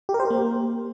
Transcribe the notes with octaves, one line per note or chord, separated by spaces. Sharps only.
G4
A#4
C5
G4
A#3